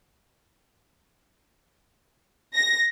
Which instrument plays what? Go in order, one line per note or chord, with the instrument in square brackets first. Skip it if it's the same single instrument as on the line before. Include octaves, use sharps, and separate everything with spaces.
[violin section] A#6